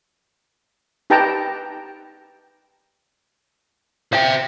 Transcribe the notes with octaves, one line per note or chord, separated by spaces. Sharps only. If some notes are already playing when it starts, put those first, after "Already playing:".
D#4 G4 B4 G5 A5 A#5
C5 E5 F5 G5